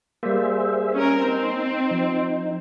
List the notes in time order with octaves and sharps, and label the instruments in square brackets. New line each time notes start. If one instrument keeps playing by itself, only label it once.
[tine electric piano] G3 A#3 [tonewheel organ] G#4 C5 E5
[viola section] C#4 A#4
[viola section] C4 [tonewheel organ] D#4
[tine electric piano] F3